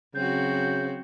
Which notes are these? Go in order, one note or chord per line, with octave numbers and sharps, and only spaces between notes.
C#3 F#3 C4 F#4 G6